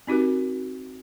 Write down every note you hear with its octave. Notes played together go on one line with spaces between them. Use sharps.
C4 D#4 F#4 G4 A#4